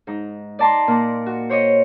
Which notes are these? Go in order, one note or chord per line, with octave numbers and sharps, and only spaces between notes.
G#2 D#4
D5 D#5 A5 A#5 C6 D6
A#2 A#5
F#4
C5 C#5 D#5